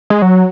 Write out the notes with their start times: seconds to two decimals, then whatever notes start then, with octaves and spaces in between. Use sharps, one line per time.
0.10 G#3
0.22 F#3